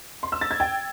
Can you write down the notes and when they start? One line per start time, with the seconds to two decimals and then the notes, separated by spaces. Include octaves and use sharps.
0.23 C6
0.32 E6
0.41 A6
0.51 G#6
0.60 G5